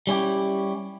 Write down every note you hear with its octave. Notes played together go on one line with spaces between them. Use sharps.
G3 C#4 E4 G4